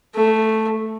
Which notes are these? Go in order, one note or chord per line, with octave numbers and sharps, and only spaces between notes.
A3